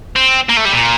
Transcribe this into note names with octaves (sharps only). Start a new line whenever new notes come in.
C4
A#3
A3
G3
A#2